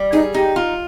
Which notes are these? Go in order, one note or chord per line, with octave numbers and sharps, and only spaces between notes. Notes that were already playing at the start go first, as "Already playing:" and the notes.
Already playing: G3
D#4 G#4
D#4 G4
F4